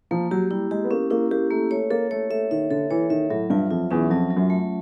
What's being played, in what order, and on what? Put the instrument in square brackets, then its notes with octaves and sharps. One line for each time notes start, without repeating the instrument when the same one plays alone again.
[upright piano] F3 [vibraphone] A#3
[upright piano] F#3 [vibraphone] G4
[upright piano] G3 [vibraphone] E4
[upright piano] G#3 [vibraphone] G4
[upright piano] B3
[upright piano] A#3 [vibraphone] C#4
[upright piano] A#3 [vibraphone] E4
[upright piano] A#3 [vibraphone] G4
[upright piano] A3 [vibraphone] A#3
[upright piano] A3 [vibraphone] C#5
[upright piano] A#3 [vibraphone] A4
[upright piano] A3 [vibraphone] C#5
[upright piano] A3 [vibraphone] E5
[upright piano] D#3 [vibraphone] E5
[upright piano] D3 [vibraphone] A4
[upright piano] E3 [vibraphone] C#5
[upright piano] D#3 [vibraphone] E5
[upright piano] A2 [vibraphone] F#3
[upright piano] G2 [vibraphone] F4
[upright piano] F2 [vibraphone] F4
[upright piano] E2 [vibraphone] C#4
[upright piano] F2 [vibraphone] F#3
[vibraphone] F#3
[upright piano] F#2
[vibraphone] A3